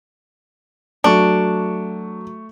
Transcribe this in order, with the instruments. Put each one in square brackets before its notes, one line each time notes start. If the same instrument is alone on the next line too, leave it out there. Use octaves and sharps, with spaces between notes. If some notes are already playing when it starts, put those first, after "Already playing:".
[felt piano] F#3 [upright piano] A3 C#6 [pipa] D4